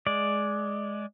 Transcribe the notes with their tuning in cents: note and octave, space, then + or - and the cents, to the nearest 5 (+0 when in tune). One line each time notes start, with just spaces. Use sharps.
G#3 +10 D5 +0